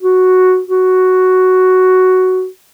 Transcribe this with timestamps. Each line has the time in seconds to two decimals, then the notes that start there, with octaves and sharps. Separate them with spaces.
0.02 F#4
0.68 F#4